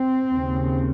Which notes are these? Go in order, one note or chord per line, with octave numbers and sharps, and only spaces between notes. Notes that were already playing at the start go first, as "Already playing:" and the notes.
Already playing: C4
D#2 C#3